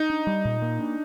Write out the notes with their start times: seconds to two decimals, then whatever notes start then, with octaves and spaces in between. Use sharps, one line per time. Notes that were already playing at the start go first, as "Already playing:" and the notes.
Already playing: D#4
0.10 D4
0.27 G3
0.45 A#2
0.62 A#3
0.79 D4